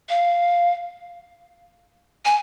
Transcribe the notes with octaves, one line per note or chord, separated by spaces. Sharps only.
F5
G#5